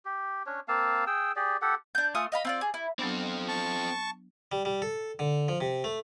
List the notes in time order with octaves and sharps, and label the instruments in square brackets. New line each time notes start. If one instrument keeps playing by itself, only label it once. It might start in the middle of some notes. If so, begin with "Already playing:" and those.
[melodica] G4
C#4 D4 C#5
A#3 C4 F5 A5
G#4 G5 E6
G4 G#4 D5
G4 A4 F#5
[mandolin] D4 G6
A3 F4 G#5 D#6
D#5 F5 B5
C4 F4 D5
G#4
E4
[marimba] F#3 B3 D4 [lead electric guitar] C4 A4
[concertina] A5 C#6
[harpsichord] G3
G3
A4
D3
F3
C3
A3